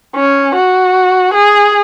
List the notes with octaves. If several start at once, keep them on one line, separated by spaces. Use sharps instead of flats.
C#4
F#4
G#4